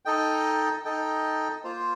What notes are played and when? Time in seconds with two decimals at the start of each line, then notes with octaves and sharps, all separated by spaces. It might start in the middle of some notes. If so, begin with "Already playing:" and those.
0.05 D#4 A4 D#5 G5
0.85 D#4 A4 D#5 G5
1.64 A#3 F4 C5